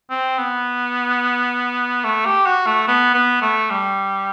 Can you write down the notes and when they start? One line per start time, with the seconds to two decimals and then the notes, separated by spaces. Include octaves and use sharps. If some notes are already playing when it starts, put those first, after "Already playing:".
0.10 C4
0.38 B3
2.04 A3
2.26 G4
2.46 F#4
2.67 A3
2.88 B3
3.14 B3
3.42 A3
3.70 G3